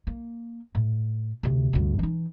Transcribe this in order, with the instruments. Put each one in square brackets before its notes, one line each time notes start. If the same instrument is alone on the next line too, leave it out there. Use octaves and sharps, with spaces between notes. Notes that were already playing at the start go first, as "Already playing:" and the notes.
[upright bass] A#3
A2
D2 C3
D2 G2
E3 D#4